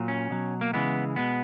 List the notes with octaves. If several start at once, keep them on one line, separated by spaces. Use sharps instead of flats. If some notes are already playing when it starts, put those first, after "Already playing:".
Already playing: A#2 F#3
C#4
B2 F#3
A#3
C#3 E3 G#3 B3
B2 G#3 B3